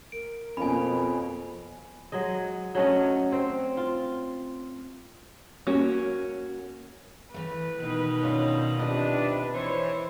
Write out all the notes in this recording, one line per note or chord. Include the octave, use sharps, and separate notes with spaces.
A#4 D7
F2 B2 A#3 C#4 G#5 B5
F#3 G#3 D#5
F#3 A3 C#4 D#5
C4
F4
A#3 C#4 F#4 A#4
E3 A3 B4
B2 D#3 D#4
C#4 D4 F4
C3 F3 D4 B4 D#5
E3 C5 C#5